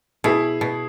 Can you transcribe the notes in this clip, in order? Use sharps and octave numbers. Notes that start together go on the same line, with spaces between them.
B2 E4 G#4
B2